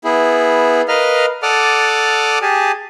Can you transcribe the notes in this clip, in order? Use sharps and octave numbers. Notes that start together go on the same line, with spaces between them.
B3 E4 G#4
A#4 B4 D#5 F5 F6
A4 D5 F#5 D6 D#6 F6
G4 G#4 G#5 A5